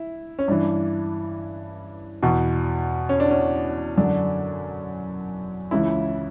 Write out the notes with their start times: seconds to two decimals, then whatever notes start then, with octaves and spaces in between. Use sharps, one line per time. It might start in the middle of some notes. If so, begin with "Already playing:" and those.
Already playing: E4
0.39 C#4
0.48 G2 E3 D4
2.23 E2 B2
3.09 C#4
3.20 D4
3.31 C#4
3.98 F#2 D3 D4
5.71 C#2 C#3 E3 E4